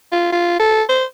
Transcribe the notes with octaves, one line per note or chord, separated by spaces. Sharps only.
F4
F4
A4
C5